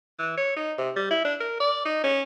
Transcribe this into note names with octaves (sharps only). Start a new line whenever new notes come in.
E3
C#5
D#4
C3
G3
E4
D4
A#4
D5
D#4
C#4